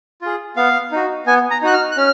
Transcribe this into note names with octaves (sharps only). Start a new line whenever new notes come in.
F4 G#4
B3 F5
D#4 F#4
B3 G#5
A#5
D#4 F#4 F#6
F6
F#6
C#4 F6